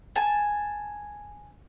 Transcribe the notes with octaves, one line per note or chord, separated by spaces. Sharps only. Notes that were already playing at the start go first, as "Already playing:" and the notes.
G#5 A5